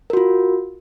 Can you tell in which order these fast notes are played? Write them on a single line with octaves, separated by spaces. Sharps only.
A#4 F#4 F4